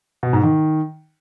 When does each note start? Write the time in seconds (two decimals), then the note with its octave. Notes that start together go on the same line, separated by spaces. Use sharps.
0.23 B2
0.33 G#2
0.43 D#3